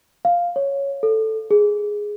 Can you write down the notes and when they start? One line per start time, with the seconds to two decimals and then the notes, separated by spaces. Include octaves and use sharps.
0.25 F5
0.56 C#5
1.03 A4
1.51 G#4